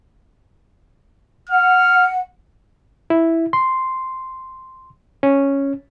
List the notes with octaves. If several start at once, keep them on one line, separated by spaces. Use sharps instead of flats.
F#5 F6
E4
C6
C#4